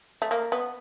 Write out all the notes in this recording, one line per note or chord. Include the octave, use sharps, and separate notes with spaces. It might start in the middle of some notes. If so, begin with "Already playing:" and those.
A3
A#3
B3